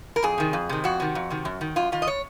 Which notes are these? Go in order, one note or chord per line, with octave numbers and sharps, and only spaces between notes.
A#4
F2 G#4
C3 D#3
F2
C3 D#3
F2 F#4
C3 D#3
F2
C3 D#3
F#2
D#3
F#2 F4
D#3 F4
D#5
C#5